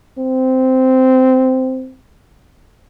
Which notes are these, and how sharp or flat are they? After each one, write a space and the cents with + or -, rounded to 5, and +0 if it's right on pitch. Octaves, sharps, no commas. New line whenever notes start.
C4 -10